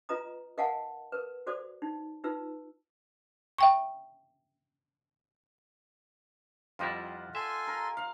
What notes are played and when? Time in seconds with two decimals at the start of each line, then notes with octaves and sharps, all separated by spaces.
0.09 F4 B4 D#5 A#5 D#6
0.58 A#4 D#5 F5 F#5 G#5 A5
1.12 A#4 B4
1.47 F#4 A4 C5 D5 D#6
1.82 D#4
2.24 D#4 F4 B4 E6
3.58 E5 G5 C#6
6.79 F2 G3 E4 F4 D#5 F#5
7.35 A4 E5 G#5 C6
7.67 A#4
7.97 F5